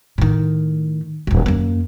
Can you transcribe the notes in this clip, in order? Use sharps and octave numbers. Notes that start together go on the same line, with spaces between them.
A2 D#3
D1 C2
F#2 A#3